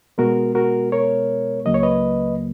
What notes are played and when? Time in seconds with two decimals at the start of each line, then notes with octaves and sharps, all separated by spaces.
0.18 B2 G#3 B3 F#4 A#4
0.55 F#4 A#4
0.92 A#4 C#5
1.65 C#2 C#3 F#3 A#3 D#5
1.74 C#5
1.83 B4 D#5